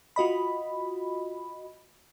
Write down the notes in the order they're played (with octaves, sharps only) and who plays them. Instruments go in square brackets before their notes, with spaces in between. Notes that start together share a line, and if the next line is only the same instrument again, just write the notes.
[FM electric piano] F4 F#4 D#5 B5